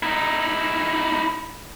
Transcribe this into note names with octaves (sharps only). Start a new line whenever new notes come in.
D#4 E4